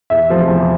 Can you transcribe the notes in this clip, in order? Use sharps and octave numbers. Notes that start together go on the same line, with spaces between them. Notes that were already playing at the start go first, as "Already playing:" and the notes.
E2 E5
C3 F3 A3
E2